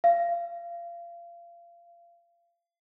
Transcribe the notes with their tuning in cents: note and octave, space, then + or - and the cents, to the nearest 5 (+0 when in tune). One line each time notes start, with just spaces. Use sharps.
F5 -30